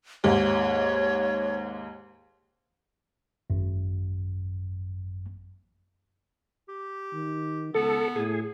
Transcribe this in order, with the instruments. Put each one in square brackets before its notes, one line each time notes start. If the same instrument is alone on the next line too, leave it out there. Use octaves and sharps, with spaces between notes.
[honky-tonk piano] D#2 G#2 [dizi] C#5
[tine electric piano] G#1 F#2
[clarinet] G4
[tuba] D#3
[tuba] C#2 [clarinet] B3 [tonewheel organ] A4
[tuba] A2 [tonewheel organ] G#4